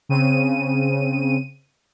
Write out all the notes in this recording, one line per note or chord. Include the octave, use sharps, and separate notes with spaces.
C#3 C4 D#7